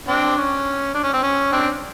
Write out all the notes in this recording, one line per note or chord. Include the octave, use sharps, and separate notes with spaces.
C4 D4
C#4
D4
C#4
C4
C#4
C4 D4